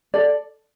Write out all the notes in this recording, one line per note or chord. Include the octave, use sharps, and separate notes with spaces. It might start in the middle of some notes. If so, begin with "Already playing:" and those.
A4 D5